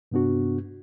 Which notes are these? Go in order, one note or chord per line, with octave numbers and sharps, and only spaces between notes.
G2 C3 B3 D4 F#4